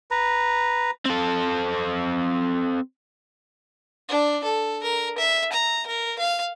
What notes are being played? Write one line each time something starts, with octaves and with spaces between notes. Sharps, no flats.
B4 A#5
C4 A4
D4
A4
A#4
E5
A#5
A#4
F5